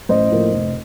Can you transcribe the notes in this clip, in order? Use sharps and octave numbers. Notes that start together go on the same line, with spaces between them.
A1 C5 D#5
A2 F3 A#3
F1